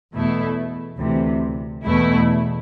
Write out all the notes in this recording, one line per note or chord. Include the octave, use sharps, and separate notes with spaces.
E2 B2 A3 E4 A4
D2 C3 E3
E2 B2 A3 E4